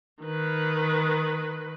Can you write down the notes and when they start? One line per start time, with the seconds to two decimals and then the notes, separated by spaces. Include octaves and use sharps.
0.23 D#3 B4